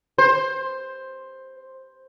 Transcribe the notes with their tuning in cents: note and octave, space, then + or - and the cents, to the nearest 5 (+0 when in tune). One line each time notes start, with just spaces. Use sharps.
C5 +10